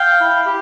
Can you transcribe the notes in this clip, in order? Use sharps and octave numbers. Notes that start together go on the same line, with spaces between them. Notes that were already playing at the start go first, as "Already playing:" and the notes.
Already playing: F5 G5
E4
G4